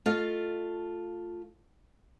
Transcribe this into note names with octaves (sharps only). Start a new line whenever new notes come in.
A3 F4 A4 D#5 F5